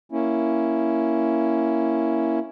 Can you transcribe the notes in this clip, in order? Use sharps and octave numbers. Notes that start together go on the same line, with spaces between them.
A#3 C#4 E4